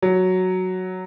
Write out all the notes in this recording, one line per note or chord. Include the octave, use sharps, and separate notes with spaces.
F#3